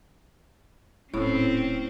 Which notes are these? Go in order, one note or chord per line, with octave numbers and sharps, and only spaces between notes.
D#1 A2 C4 C#4 A4